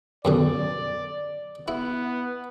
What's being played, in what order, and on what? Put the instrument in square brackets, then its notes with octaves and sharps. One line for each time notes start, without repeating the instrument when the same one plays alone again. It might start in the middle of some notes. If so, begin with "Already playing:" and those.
[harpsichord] F#2 B2 D3 [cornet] D5
[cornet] B3 [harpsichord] E4